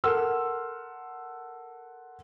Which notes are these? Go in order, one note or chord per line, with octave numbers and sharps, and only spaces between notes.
A4 A#4 F#5 C6 E6 F6